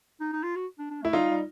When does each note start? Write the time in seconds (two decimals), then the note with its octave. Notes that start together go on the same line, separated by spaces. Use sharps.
0.20 D#4
0.33 D#4
0.43 F4
0.56 F#4
0.79 D4
0.91 D4
1.02 A3 E4
1.13 G3 D#4 F4
1.29 G3